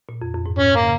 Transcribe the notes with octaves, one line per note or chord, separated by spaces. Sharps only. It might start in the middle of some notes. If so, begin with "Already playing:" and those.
A#2
F2
F2
G#2
A#2 C#4
A#3
C#3